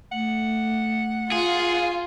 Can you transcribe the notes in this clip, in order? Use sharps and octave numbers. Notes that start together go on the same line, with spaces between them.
A3 F#5
F4 G#4